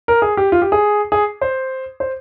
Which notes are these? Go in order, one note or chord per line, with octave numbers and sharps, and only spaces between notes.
A#4
G#4
G4
F4
G4
G#4
G#4
C5
C5